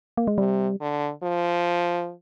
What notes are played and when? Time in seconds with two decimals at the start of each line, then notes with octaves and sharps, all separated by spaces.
0.17 A#3
0.27 G#3
0.38 C3 G3
0.80 D3
1.23 F3